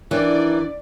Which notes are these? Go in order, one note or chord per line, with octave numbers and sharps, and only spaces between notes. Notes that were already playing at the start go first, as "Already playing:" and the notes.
D#3 E3 D4 D5